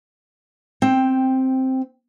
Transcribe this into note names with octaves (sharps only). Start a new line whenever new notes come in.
C4 G5